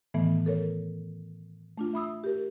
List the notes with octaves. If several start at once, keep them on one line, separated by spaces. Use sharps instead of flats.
A2 D#3 E3 A3 B3
A4 A#4 C#5
A3 D4 F4
E5 B5 D#6 E6
G4 A#4